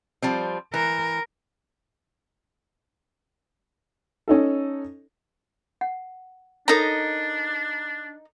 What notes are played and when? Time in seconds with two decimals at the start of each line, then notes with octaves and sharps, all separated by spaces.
0.22 F3 G3 C4
0.74 E3 A#4
4.28 C#4 D#4 A4
5.81 F#5
6.68 D4 D#4 A4 A#4 C#5 A#5